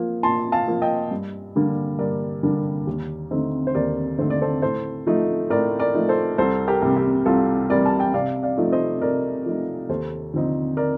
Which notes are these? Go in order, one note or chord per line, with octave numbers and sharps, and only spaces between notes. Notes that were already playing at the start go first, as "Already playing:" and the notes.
Already playing: F3 A#3
A#2 A5 C6
F5 A5
F3 A#3
D#5 G5
G2
D3 G3 A#3 D4
G2 A#4 D5
D3 G3 A#3 D4
D#2
D3 A3 C4 D#4
C5
D#2 A#4 D5
D3 A3 C4 D#4 C5
D5
A4 C5
A2 A4 C5
F3 A3 D#4
A2 A#4 D5
A#4 D5
F3 A3 D#4
A4 C5
C2 A4 C5
G4 A#4
C3 G3
G4
C2 F4 A4
C3 G3 A#4 D5
A5
G5
C3 D5 F5
D5 F5
F3 A3 D#4
C5 D#5
C3 A#4 D5
F3 A3 D#4
D#2 A4 C5
D3 F3 C4 D#4
A#4 D5